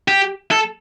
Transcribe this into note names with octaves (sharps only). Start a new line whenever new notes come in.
G4
A4